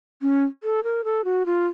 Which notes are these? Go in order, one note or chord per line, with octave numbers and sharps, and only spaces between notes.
C#4
A4
A#4
A4
F#4
F4